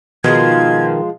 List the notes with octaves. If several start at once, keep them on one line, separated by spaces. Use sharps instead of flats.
B2 D#3 F3 G#3 F4 G#6